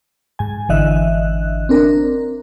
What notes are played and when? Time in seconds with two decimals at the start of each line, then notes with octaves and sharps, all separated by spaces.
0.39 G#2 G#5
0.69 G#1 D3 E3 D#5 E5 F#6
1.69 C4 D4 A#4